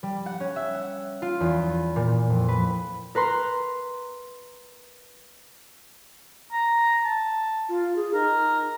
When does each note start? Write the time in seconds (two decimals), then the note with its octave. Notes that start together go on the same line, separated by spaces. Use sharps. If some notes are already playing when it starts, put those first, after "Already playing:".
0.03 G3
0.26 F#5
0.40 C#4
0.56 E5
0.75 F#5
1.22 F4
1.40 E2
1.96 A#2
2.30 F2
2.48 B4
3.15 A#4 B4 A#5 C6
6.53 A#5
7.05 A5
7.69 F4
7.96 G#4
8.14 D#4 A#4